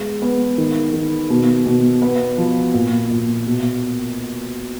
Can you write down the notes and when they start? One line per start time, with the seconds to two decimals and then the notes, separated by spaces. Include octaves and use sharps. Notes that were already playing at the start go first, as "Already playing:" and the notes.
Already playing: G#3 B3
0.22 B3
0.58 D#3
0.93 D#3
1.30 B2
1.66 B2
2.02 B3
2.38 F3
2.74 A#2
3.11 A#2
3.47 B2